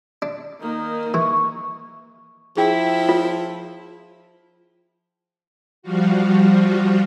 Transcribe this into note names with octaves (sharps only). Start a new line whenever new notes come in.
D4
D#3 A#3 D#4
E3 C#6
F3 E4 G#4 G5
F4
F3 G3 F4 F#4